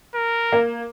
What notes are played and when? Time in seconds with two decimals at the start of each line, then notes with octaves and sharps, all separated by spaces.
0.15 A#4
0.52 A#3